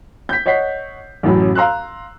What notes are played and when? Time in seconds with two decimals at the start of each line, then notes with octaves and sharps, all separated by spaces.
0.29 G6 B6
0.46 C#5 D#5 F#5 B6 C7
1.23 A1 F#2 A2 F#3 B5
1.55 F5 A#5 C6 E6 F#6